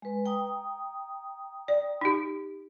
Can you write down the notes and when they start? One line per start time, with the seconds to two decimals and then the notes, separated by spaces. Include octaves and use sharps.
0.02 G#3 B4
0.26 G5 A#5 D#6
1.68 D5
2.01 D#4 G4